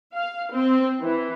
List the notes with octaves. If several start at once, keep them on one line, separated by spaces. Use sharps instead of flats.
F5
C4
E3